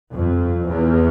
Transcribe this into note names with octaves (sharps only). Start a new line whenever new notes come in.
F2
E2